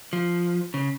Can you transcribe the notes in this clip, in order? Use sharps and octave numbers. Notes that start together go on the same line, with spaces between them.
F3
C#3